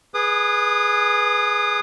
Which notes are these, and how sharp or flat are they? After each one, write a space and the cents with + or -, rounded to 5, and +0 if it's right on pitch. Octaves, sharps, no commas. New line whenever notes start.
G#4 +0 B4 -5 D#6 -30